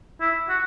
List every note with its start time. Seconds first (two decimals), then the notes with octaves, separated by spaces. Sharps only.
0.21 E4
0.49 F#4